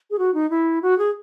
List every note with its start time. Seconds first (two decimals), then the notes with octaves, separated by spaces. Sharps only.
0.11 G#4
0.19 F#4
0.34 D#4
0.50 E4
0.82 F#4
0.98 G#4